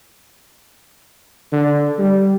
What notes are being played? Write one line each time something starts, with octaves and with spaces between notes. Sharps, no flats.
D3
G3